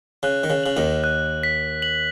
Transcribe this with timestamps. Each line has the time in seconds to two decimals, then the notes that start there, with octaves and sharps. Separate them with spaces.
0.23 C#3 F#6
0.44 D#3
0.50 C#3
0.64 C#3 F#7
0.77 D#2 D#3
1.04 F#6
1.43 B6
1.82 F#7